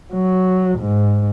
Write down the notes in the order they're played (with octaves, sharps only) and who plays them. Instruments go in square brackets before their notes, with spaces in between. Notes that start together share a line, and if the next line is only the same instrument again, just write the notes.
[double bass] F#3
G#2